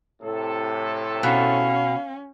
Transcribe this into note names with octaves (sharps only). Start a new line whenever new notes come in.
A2 C3 A4
B2 C#4 F5